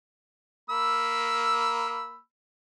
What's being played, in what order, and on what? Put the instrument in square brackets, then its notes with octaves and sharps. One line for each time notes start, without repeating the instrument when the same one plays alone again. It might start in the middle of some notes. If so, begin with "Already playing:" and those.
[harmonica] A#3 B5 E6